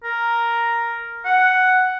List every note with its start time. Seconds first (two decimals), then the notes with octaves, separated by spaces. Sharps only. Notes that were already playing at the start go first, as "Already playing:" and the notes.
0.04 A#4
1.25 F#5